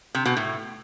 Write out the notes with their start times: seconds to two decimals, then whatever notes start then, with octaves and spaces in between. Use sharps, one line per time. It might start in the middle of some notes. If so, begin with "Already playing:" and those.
0.15 C3
0.26 B2
0.37 A2